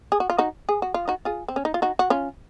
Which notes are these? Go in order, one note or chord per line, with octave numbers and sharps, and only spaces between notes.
G#4
F#4
F4
D#4 F#4
G#4
F#4
F4
D#4 F#4
F4 G#4
C4
C#4
D#4
F4
D#4 F#4
F#4
C#4 F4